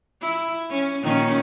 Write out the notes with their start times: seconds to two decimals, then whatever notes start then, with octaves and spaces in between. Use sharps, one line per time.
0.21 E4
0.69 C#4
1.02 A#2 D#3 C#4